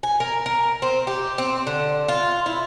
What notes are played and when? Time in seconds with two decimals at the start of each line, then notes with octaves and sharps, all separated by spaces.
0.03 G#5
0.20 A#4
0.46 A#4
0.82 C4
1.07 G4
1.38 C4
1.67 D3
2.08 F4
2.46 E4